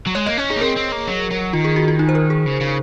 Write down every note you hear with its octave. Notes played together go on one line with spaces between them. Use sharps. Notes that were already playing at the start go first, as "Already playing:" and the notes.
F#3
G#3 C#5
A#3 D#5
C#4 C#5
D#4 G#4
A#3
C4 A#4
C4
A#3
F#3
F#3
D#3 F4
G#4
F#4
F4
D#4
C5
A#4
G#4
C#3
C#3